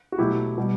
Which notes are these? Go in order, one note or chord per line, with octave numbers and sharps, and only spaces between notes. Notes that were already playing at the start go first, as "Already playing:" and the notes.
F#4
B2 F#3 A3 E4 G4
B2 G3